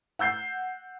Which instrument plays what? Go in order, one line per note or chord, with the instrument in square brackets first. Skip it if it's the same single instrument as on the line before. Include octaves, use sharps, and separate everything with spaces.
[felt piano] F#5 E6 G6 C7